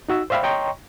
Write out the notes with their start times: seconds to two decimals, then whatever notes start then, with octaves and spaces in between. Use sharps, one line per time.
0.09 D#4 F#4 E6
0.30 C5 D5 E5 F5 G5 B5
0.43 C#5 D#5 G5 A#5 C6 C#6